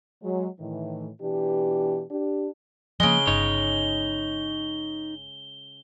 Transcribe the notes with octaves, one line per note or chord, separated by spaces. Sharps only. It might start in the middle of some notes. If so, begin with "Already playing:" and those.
F#3 G#3
A2 D#3 E3
B2 E3 D4 G4
D4 G4
C#3 F3 G#3 A#3 G7
G1 D#4 C#5